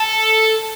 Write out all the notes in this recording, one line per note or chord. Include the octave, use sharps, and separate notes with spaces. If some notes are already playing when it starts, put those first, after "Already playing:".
Already playing: A4